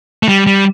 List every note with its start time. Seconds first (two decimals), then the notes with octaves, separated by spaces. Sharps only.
0.23 A3
0.28 G3
0.47 G3